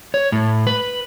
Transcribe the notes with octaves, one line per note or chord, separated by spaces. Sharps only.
C#5
A2
B4